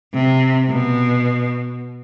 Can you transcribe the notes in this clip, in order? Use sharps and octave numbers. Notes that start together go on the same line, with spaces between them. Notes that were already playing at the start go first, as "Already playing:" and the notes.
C3
B2